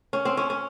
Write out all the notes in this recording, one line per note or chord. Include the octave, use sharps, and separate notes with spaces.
C#4
C4
C#4
C#4